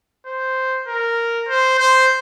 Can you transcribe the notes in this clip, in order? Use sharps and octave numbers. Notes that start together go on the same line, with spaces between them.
C5
A#4
C5
C5